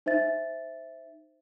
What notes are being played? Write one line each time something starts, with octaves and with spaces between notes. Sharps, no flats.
D#4 C5 E5 A6